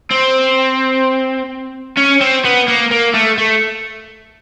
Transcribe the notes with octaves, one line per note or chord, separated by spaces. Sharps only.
C4
C#4
C4
B3
A#3
A#3
A3
A3